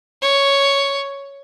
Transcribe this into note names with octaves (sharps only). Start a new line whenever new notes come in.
C#5